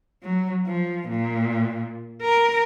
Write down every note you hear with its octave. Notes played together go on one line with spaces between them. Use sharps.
F#3
F3
A#2
A#4